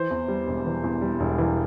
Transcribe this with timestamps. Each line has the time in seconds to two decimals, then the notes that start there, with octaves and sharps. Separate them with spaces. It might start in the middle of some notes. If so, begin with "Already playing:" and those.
Already playing: E3 C5
0.10 E2
0.28 G3
0.47 E1
0.65 E3
0.84 E2
1.02 G3
1.20 E1
1.38 E3